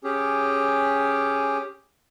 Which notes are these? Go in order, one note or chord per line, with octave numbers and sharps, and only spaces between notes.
C#4 G4 G#4